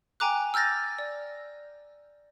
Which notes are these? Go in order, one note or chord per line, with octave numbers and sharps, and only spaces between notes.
G5 G#5 A#5 D6 F#6
E6 F6 G6 A6 A#6
D5